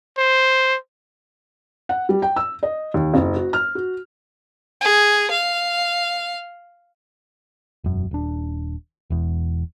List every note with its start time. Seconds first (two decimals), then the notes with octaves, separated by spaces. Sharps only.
0.18 C5
1.89 F#5
2.09 G3
2.22 G5
2.36 E6
2.63 D#5
2.94 D#2
3.14 F#1
3.36 F#4
3.53 F6
3.75 F#4
4.81 G#4
5.30 F5
7.84 E1 F#2
8.11 D#1 D4
9.10 E1 E2